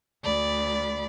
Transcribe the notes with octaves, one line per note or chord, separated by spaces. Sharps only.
D2 D5 B5